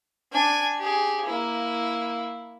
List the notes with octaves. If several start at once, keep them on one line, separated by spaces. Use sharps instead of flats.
D4 G#5
G4 G#4
A#3 E4